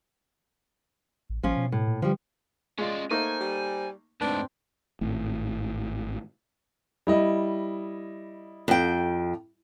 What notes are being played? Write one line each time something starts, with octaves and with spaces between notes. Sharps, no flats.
A1
A1 F3 C#4 F4
B2
A2
A#2
D3 F3 G3
G#3 C#4 F4 D5 D#5
A3 A#3 D#4 C5 G#5
G3
D2 G#2 C4 D4 B4
G#1 A2
G3 E4 D#5
F2 G5